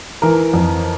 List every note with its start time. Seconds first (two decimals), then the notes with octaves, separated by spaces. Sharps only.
0.22 E3 A#4
0.53 F2